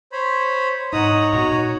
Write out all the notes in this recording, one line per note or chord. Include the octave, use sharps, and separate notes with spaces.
C5 C#5 B5
G#2 D#4 C#5 F#5 A#5 D#6
A#2 B3 F#4